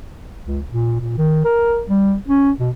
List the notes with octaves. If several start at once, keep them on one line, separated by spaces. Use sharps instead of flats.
C#2
A#2
A#2
D#3
A#4
G3
C#4
B2